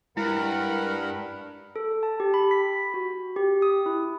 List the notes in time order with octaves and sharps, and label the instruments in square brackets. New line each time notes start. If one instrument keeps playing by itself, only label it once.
[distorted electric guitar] G2 [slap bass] G#3 [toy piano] E4 [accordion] A#4 F#5 B5
[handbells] A4
A5
G4
B5
B6
F#4
G4
D#6
E4